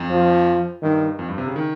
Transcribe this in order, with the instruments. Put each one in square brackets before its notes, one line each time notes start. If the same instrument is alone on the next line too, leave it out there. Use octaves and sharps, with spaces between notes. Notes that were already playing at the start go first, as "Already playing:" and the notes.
Already playing: [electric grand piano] F2
[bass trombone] F3
[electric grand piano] G2 [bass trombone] D#3
[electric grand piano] F2
G2
C3
C#3
D#3